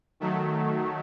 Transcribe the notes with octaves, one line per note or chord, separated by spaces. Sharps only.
D#3 F#3 A3